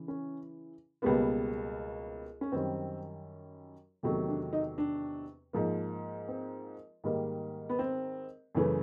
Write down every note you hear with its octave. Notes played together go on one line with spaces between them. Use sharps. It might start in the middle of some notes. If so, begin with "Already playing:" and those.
Already playing: C#3 E3
C#4
C#2 B2 G3 A#3 B3
C#4
F#2 D#3 G3 C4
E2 C3 D#3 F#3 A3
D4
D#4
D4
G#2 F3 A#3
C4
G#2 D#3 G3 A#3
B3
C4
F#2 C#3 E3 A3